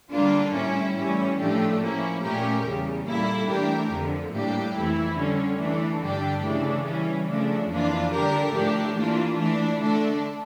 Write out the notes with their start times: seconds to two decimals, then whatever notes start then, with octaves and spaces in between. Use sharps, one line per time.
0.12 D3 G3 A#3 D4 F4
0.54 A2 G3 C#4 E4
0.96 A2 E3 G3 C#4
1.39 A2 F3 A3 D4 G4
1.81 F3 A#3 C#4 E4
2.23 A#2 A3 C#4 G4 A#4
2.66 E2 C#3 G3
3.07 A#2 G3 A#3 E4 A4
3.49 E3 A3 D4 G4 A#4
3.91 F2 D3 F3
4.33 A2 G3 A#3 D4 G4
4.75 F2 E3 A3 E4
5.18 D3 G3 C#4
5.60 E3 A3 D4
6.01 G2 D3 G3 D4 G4
6.44 C#3 E3 A3 D4
6.86 E3 G3 C#4
7.29 C#3 F3 A3 D4
7.70 F2 E3 A#3 D4 F4
8.13 D3 G3 D4 G4 A#4
8.54 A2 F3 A3 D4 G4
8.96 E3 A#3 D4 F4
9.38 E3 A3 D4
9.81 D3 A3 D4 A4